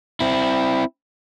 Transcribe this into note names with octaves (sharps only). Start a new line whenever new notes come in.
C4 E4